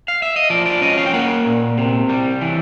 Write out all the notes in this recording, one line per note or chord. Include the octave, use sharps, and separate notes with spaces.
F5
E5
D#5
F3 D5
D5
C#4 D#5
F5
G5
A#3 F#5
A#2
C3
G3
E3